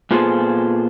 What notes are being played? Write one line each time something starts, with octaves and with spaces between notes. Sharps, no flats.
A#2 B3 F4 G#4 A4 C5